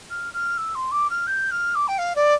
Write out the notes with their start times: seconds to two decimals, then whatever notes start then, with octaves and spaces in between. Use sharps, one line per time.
0.10 F6
0.33 F6
0.57 E6
0.75 C6
0.91 D6
1.10 F6
1.27 G6
1.51 F6
1.75 D6
1.87 G5
1.98 F5
2.15 D5